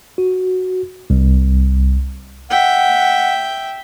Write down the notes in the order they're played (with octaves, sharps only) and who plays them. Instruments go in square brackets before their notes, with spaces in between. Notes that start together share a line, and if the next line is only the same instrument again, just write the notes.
[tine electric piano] F#4
C2
[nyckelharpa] E5 G5 [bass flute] F#5